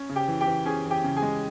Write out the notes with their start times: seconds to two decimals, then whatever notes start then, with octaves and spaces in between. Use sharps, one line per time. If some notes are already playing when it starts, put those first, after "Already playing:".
Already playing: C#4
0.09 C#3
0.16 G4 G5
0.28 E3
0.41 G4 G5
0.47 E3
0.65 C#4 G#4 G#5
0.85 E3
0.91 G4 G5
1.04 C#3
1.16 G#4 G#5
1.22 G#3